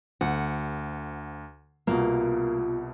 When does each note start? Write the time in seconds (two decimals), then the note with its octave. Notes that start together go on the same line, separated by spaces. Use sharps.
0.21 D2 F#5
1.87 C2 B2 A#3 F4